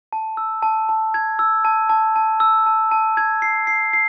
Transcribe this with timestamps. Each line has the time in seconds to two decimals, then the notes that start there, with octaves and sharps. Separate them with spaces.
0.13 A5
0.37 E6
0.62 A5
0.89 A5
1.14 G#6
1.39 E6
1.65 A5
1.89 A5
2.16 A5
2.40 E6
2.66 A5
2.91 A5
3.17 G#6
3.42 C7
3.67 C7
3.93 C7